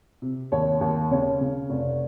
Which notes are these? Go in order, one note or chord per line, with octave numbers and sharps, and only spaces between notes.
C3
D#2 C#5
D#2
C#3 C#5
C#3
F1